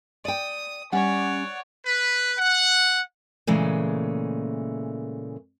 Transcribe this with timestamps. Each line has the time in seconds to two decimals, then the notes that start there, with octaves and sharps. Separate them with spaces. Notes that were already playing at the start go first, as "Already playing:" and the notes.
0.25 D5 G5 D#6
0.92 G3 C#4 C#5 D5 F#5
1.85 B4
2.39 F#5
3.47 A#2 C#3 E3 G#3 A3